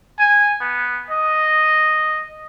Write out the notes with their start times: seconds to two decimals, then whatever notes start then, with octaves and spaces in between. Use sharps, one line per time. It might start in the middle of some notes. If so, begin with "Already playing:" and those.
0.19 G#5
0.61 B3
1.10 D#5